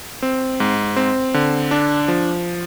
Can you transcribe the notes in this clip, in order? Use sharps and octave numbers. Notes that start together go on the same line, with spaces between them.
C4
G#2
C4
D3
D4
F3